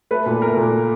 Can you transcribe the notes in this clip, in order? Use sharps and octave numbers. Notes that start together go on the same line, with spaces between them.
A3 B4
A#2
A3 A#4
A#2